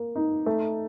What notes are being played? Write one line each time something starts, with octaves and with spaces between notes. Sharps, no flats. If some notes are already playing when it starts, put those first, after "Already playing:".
Already playing: A#3
D#4
A3